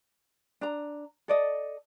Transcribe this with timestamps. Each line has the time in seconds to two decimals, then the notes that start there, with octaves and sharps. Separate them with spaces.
0.61 D4 A#5
1.28 A4 D5 D#5